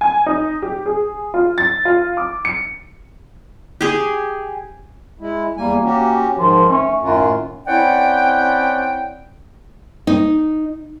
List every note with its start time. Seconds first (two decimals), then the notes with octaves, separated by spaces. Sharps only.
0.01 G#5
0.26 D#4
0.62 G4
0.86 G#4
1.34 F4
1.58 A6
1.85 F4
2.17 D6
2.45 C#7
3.81 G4 G#4
5.20 G#3 E4
5.57 E2 G3 A#3 G#5
5.84 C#4 F#4 G4
6.38 G#2 D#3 F3
6.70 A3 C#4
7.03 F#2 A2 D#3 F4
7.67 C4 C#4 E4 D5 F#5 G5
10.07 D#4